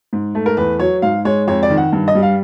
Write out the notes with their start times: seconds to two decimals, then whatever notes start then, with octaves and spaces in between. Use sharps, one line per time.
0.13 G#2
0.35 A3
0.46 A#4
0.57 E2 B4
0.80 F#3 C#5
1.02 G#2 F5
1.25 G#3 C#5
1.48 F2 C#5
1.63 D5
1.70 D#3
1.77 F#5
1.93 G2
2.08 D#5
2.15 G3
2.23 F5